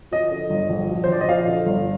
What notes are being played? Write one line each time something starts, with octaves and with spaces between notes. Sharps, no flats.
F3 D#5
D3
G1
A#1
F3
C5
A#1 D5
D#5
F3 F5
D3
G1